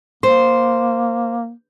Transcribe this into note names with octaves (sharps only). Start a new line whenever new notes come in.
A#3 C5